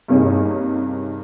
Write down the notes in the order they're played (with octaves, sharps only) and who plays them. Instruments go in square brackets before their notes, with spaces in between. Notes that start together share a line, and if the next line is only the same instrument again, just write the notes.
[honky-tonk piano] G2 C3 A#3 C#4 D#4 G#4